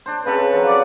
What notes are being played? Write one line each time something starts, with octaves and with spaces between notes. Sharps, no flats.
D4 C5
C#3 C4 A4 B4
F3 F#3
D5